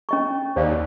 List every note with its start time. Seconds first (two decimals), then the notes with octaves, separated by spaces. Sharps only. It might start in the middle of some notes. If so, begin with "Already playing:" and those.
0.09 C#4 D#5 C#6
0.56 D#2 C5 D5 F5